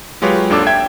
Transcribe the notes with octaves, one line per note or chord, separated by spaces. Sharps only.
F#3 G#3 F4 G4 B4 C#5
G#1 D#2 D4 A4 D6 E6
E5 G5 G#6